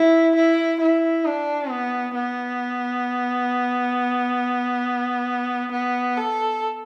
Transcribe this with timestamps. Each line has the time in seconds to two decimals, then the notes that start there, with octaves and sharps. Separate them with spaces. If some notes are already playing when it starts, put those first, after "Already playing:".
Already playing: E4
0.35 E4
0.80 E4
1.25 D4
1.70 B3
2.14 B3
5.71 B3
6.16 A4